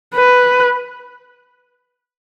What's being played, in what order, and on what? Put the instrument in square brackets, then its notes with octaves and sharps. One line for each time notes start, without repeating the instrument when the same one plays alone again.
[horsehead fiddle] B4